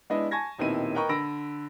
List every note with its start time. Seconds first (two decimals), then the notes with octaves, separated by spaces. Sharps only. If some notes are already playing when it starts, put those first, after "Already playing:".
0.10 G#3 B3 D4 E4 D#5
0.31 G#5 A5 C#6 G#6 A#6
0.58 D#1 B2 D#3 C4 E4 D#7
0.95 A#4 B4 D#5 G5 A#5 C#6
1.09 D3 B5 E6 A#6 D7